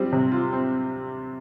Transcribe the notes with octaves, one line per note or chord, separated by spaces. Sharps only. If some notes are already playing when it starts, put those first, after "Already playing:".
Already playing: G3 C4 F4
C3
F4
C4